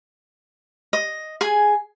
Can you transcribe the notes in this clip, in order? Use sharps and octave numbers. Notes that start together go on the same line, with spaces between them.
D#5
G#4 G#5